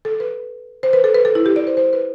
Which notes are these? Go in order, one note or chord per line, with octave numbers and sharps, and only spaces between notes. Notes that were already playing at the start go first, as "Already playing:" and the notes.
A4
B4
C5
B4
A4
B4
A4
E4
G4
D5
C5
C5
B4